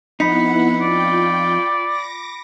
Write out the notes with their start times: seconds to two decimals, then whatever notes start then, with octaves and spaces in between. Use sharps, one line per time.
0.20 F2 B3 D#4 E4 F#5 B5 B6 C#7
0.81 F4 D5 G5
1.87 D6 A#6